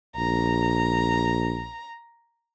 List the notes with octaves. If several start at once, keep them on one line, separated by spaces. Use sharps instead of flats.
A#1 A#5